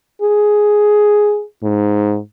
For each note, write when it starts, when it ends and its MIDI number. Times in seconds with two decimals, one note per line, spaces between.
0.22 1.44 68
1.63 2.19 44